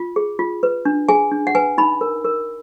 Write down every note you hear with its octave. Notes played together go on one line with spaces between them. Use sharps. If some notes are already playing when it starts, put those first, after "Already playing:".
Already playing: F4
G#4
F4
B4
D4
G#4 G#5
D4
F#5
B4 G#5
D#4 B5
A#4
A#4